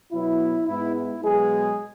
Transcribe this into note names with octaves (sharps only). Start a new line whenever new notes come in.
B2 F#3 B3 E4
G#2 G#3 B3 E4
E4
B2 F#3 G#3 B3 G#4